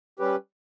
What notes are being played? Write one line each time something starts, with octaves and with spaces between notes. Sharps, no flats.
G3 C#4 G4 B4